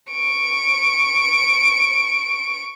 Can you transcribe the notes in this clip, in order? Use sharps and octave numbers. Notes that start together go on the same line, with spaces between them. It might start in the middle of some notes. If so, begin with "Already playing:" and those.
C#6 D7